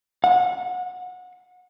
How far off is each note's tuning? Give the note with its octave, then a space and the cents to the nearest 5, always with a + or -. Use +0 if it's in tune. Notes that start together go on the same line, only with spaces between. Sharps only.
F#5 -25